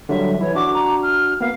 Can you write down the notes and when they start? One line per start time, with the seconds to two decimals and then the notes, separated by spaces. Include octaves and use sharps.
0.09 D3 F#3 G3 E5
0.41 E3 E4 C#5
0.55 D4 F#4 D6
0.74 A#5
1.02 F6
1.41 A#3 B3 F5